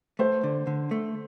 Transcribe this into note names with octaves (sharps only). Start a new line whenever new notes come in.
A3 C5
D3
D3
A3